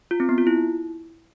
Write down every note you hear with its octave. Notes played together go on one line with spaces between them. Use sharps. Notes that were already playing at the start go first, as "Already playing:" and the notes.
F4
C4
B3
F4
E4